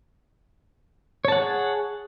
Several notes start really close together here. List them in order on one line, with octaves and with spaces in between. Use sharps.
C#5 A5 F#5 G#4